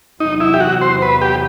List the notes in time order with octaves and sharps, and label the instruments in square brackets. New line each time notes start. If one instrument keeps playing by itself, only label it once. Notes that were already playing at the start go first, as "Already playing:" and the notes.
[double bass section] E2 C3 F#3 [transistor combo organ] D#4
[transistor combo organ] E4
G4
F#4
C5
B4
G4